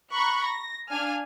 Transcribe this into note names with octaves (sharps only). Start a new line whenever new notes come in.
A#5 B5 C#6 F#6
A#6
D4 F5 G#5 F6